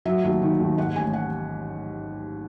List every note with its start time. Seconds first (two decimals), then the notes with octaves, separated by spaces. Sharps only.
0.05 F#3 E5
0.24 D#2
0.42 D#3
0.60 D#2
0.77 G#2 F#5
0.96 A1 G#5
1.13 F#5